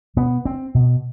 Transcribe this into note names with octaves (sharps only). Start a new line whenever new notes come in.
B2 B3
C4
B2